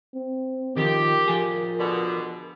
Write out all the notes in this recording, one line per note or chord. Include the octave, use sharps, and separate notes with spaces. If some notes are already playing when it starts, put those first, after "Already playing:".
C4
D#3 F3 G4 A#4
F3 G#4
B2 D3